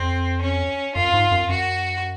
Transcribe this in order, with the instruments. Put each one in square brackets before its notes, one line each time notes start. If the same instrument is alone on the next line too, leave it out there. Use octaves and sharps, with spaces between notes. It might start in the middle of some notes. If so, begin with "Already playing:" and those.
Already playing: [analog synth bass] F2 [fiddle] C4
[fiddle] C#4
[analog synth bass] F#2 [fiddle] F4
[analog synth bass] G#2
F#2
[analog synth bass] F#2 [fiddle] F#4